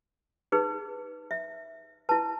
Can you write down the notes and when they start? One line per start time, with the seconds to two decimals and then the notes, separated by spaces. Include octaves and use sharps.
0.52 D#4 G#4 B4
1.31 E5
2.09 E4 B4 A5